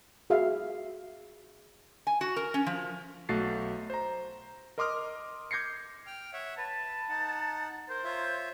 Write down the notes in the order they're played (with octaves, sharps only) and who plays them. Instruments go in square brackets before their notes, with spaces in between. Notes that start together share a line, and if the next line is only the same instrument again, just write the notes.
[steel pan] F#4 G#4 E5 F5
[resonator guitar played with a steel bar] G#5
F#4
A#4
C#4
F3
[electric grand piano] B1 A3 F#4 A6 C7
C5 A#5
A#4 D#5 C6 D6 D#6 F6
D6 G6 G#6 A#6 C7 C#7
[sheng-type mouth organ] G5 F6
C#5 E5 F#5
[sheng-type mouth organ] B4 [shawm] A5
[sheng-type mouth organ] D#4 F#5
[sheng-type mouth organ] A#4 [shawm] C5
[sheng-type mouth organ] F4 C#5 E5